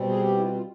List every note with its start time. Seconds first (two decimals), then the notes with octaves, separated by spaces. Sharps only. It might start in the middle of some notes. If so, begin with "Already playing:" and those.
Already playing: B2 G3 C4
0.09 G#4
0.20 G4
0.37 E4
0.41 F4
0.54 F4